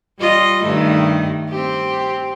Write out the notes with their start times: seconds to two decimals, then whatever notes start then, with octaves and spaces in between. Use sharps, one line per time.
0.19 G3 F4 D#5
0.63 G2 D#3 A3
1.49 C4 G4